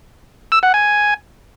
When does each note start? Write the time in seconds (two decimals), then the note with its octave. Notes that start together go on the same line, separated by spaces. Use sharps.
0.52 E6
0.63 F#5
0.74 G#5